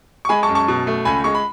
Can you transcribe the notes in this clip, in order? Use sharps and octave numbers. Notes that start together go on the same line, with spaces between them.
C#6
G#3 G#5 B5
A5 C#6
F#2
A5 C#6
B2
A3
C#2 G#5 B5
G#3 C#6
B5